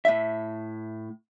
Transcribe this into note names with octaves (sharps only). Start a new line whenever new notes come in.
A2 E5